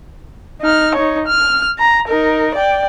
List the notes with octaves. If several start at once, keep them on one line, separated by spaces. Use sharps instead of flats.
D#4 F6
D#4 C#5
F6
A#5
D#4 A#4
D5 G5